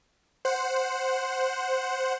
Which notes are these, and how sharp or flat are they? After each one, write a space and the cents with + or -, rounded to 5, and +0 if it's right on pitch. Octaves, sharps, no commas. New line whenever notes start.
C5 +0 F#5 +0